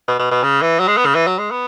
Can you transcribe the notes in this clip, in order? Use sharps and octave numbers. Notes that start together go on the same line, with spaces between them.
B2
B2
B2
C#3
E3
F#3
G#3
B3
C#3
E3
F#3
G#3
B3